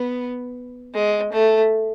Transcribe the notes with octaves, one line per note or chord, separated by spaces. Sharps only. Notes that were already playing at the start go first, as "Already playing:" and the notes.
Already playing: B3
G#3
A3